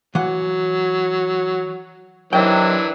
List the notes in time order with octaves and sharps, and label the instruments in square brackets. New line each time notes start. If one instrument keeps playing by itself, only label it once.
[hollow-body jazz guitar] E3 F#5 [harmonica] F#3
[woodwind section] C3 D#3 F#3 [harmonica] E3 D4 [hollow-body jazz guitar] G5